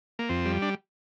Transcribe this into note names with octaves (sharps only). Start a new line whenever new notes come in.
A#3
F2 C4
G3
D4